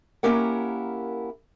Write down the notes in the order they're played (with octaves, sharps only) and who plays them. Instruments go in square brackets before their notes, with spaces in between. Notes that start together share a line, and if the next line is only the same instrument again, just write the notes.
[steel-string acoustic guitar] A#3 C#4 E4 G4 A#4 F#5